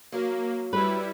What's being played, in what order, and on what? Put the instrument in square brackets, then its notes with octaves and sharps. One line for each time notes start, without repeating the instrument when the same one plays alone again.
[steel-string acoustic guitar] F#3 [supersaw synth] A#3
[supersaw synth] G3 E4 [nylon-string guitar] B4